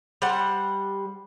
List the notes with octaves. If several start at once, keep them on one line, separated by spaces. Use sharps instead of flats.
G3 C5 F#5